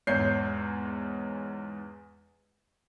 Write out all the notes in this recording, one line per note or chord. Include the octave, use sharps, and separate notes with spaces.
E2 G#2 C#5 G6 C7